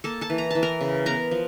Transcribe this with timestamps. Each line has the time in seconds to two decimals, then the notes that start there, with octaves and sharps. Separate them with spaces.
0.04 A#3 A4 A5
0.21 A4 A5
0.30 E3
0.38 A#5
0.51 E3 A5
0.63 A#4 A#5
0.81 C#3
1.06 B3 A#4 A#5
1.31 F3